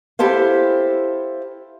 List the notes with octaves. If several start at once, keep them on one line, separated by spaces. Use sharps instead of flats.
E4 G4 A4 C5 F5